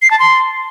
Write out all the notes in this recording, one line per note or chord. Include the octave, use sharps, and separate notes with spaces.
C7
A5
C6